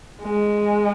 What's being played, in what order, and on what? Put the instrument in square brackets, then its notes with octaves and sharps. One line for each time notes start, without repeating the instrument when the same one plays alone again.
[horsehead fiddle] G#3